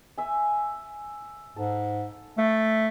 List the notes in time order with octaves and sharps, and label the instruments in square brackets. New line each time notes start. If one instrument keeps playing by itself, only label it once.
[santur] E5 G#5
[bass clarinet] G#2 [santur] A4
[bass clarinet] A3 [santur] F5